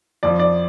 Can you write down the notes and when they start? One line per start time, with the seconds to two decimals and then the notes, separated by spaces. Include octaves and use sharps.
0.23 F2 F3 D5
0.39 D5